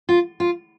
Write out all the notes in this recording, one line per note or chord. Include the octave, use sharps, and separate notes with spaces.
F4
F4